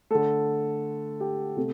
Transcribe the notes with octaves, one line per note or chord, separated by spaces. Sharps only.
D3 A3 A4
G4
C3 A3